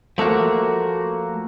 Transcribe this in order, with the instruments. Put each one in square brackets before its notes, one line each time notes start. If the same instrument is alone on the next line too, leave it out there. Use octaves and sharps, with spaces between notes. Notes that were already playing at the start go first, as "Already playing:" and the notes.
[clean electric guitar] F3 A3 A#3 F#4